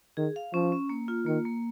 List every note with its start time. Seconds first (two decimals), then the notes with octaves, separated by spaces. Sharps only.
0.17 D#3 G#4
0.36 F5
0.53 F3 C#4
0.72 C#4
0.89 A#3
1.08 F4
1.26 D#3 A#3
1.45 A#3